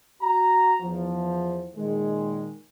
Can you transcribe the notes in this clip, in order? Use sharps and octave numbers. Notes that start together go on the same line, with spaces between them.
F#4 A#5
E2 F3
A#2 D#3 G#3